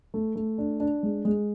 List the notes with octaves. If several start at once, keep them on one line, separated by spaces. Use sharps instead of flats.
A3
A3
D4
D4
G#3
G#3